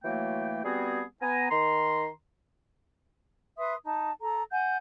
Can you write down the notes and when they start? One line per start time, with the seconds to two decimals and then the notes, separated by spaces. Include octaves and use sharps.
0.04 E3 F#3 A3 A#3 G5
0.65 G3 B3 C4 F#4 G#4
1.22 B3 G#5 A#5
1.51 D#3 A#5 C6
3.57 B4 E5 C6 D#6
3.84 D#4 A5
4.21 A4 A#5
4.51 F#5 G#5 G6